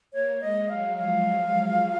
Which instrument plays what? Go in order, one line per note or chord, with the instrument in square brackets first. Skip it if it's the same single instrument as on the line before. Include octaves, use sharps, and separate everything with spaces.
[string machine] A#3 [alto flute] C#5
[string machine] G#3 [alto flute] D#5
[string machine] F#3 [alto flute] F5
[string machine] F3 [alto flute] F5